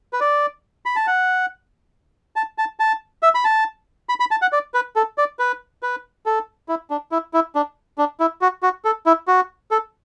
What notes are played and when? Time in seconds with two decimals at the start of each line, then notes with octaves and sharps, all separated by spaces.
0.13 B4
0.20 D5
0.86 B5
0.96 A5
1.07 F#5
2.36 A5
2.58 A5
2.79 A5
3.23 E5
3.35 B5
3.44 A5
4.09 B5
4.20 B5
4.31 A5
4.42 F#5
4.52 D5
4.74 B4
4.96 A4
5.18 D5
5.39 B4
5.83 B4
6.26 A4
6.69 E4
6.90 D4
7.12 E4
7.34 E4
7.55 D4
7.98 D4
8.20 E4
8.41 F#4
8.63 F#4
8.85 A4
9.06 E4
9.28 F#4
9.71 A4